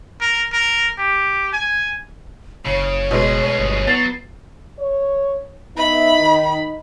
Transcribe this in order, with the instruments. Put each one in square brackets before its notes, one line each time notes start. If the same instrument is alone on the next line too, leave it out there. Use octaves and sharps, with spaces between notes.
[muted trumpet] A#4
A#4
G4
G#5
[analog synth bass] F#1 [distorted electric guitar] C#3 [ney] C#5
[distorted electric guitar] D2 G#4 [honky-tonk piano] B2 G#3
[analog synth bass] G1
[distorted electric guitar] F#3 [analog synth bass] B3 [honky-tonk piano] A6 C7
[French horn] C#5
[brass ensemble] B3 E5 [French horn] D#4 [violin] B5
[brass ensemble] D#3